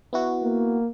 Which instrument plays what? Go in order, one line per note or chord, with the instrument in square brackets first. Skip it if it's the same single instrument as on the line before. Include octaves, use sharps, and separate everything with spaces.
[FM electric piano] B3 E4 F#4
[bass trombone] A#3